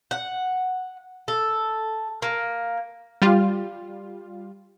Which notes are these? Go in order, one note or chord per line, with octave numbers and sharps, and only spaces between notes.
F#5
A4
A#3
G3 F4